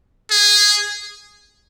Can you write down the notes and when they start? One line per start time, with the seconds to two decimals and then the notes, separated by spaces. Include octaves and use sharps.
0.31 G#4